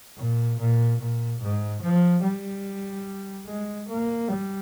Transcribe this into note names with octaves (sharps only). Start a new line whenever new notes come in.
A#2
A#2
A#2
G#2
F3
G3
G#3
A#3
G3